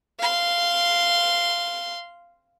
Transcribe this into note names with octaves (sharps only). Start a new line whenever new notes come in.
F5 C6